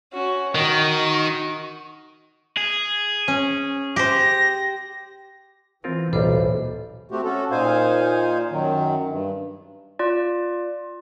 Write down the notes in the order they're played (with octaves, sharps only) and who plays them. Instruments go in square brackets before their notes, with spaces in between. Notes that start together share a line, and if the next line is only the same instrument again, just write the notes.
[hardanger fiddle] C#4 F#4
[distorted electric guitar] D#3 [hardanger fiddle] F#4 D#5
[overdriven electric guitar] G#4
[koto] C#4
[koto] G4 C5 [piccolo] A#6
[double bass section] E3 [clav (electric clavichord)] C4 F4 A#4
[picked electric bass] D1 A#2 [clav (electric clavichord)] B1 G3 [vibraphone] A4 C5
[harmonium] A3 C4 F#4 G4
C#4 F#4 A4
A#2 D#4 C5 F5 G#5
F#2 D#3 F#3
G2
[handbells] F4 D5